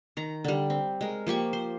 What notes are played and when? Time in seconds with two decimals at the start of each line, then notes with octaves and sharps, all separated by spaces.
0.17 D#3 A#5
0.44 D3 G3
0.70 C4
1.01 G#3 A#4
1.27 F3 A#3 G4 C#6
1.53 C5